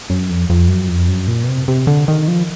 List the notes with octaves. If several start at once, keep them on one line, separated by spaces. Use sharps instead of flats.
F#2
F2
F2
F#2
F2
F#2
A#2
B2
C3
C3
D3
D#3
F3